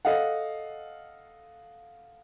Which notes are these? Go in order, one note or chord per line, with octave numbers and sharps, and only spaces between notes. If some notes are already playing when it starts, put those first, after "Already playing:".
A4 D#5 F5 F#5